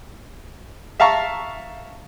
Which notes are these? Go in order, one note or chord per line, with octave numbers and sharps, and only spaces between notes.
E5 F5 A5 A#5 C#6